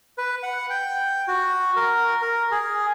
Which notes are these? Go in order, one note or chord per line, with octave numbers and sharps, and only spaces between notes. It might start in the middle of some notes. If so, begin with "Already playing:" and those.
B4
F#5
G5
F#4
A#4
A#4
G#4